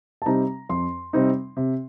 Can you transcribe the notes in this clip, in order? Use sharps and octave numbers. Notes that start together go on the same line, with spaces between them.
A5
C3 G3 C4 D#4 A#5
F2 C6
C3 G3 C4 D#4
C3